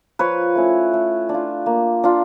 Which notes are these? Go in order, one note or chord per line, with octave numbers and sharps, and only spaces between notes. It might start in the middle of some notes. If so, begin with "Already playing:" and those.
F3 B4 C#5
A3 C#4 E4
A3
D4 F4
A#3
D4 F4